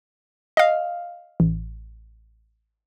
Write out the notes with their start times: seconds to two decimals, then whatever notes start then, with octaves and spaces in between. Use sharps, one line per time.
0.57 D#5 F5
1.40 A1